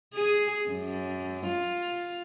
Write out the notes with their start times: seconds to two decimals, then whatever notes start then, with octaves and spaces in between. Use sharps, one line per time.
0.14 G#4
0.70 F#2
1.46 F4